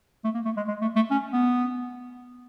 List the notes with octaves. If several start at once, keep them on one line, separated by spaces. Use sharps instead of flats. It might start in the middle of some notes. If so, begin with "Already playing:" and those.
A3
A#3
A3
G#3
G#3
A3
A3
C#4
B3